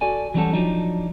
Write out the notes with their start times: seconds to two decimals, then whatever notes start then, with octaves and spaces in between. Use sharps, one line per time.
0.01 F#4 A4 D5 G#5
0.34 E3 F#3 G3 C#4 F#4 A4
0.53 F3 F#3 D4 D#4